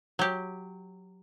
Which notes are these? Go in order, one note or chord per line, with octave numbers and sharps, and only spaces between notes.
F#3 G4